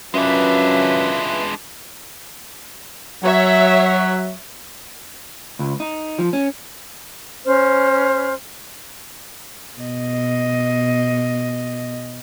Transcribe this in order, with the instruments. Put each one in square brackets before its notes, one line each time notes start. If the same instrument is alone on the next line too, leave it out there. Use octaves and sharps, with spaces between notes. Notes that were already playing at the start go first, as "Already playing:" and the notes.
[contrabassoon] F#2 [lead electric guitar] G#3 D4 [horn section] C#4 F4 B4 [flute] E5
[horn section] F#3 [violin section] C#5 E5
[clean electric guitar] C#2
D#4
F3
C#4
[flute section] C#4 C5 F6
[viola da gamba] B2 D#5